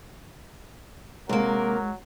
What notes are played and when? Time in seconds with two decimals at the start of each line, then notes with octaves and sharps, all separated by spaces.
1.29 C3 F#3 G#3 A#3 A#4